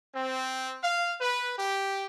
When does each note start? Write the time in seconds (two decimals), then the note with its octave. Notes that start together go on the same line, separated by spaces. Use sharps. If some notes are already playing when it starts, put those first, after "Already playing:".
0.15 C4
0.81 F5
1.20 B4
1.57 G4